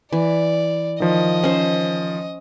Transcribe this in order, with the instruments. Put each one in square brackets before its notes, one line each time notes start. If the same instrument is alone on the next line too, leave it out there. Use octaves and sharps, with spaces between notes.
[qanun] E3 [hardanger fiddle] D5
[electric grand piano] D#3 F3 [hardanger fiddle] D#5
[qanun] C#4 C5